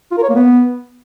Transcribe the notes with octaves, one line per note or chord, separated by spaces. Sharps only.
F4
A#4
C#5
A#3
B3